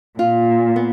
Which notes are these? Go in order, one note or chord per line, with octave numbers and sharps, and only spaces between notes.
A#2 F4
B3